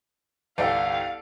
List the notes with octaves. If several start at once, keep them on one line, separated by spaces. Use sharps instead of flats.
G1 C2 A4 D5 F5 G5